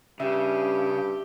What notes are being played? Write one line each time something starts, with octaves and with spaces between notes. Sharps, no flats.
G2 C#3 G4 E5